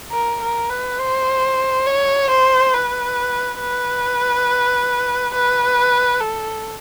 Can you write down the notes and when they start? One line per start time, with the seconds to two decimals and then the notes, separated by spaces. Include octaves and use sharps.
0.12 A#4
0.42 A#4
0.70 B4
0.99 C5
1.87 C#5
2.30 C5
2.74 B4
3.61 B4
5.34 B4
6.21 A4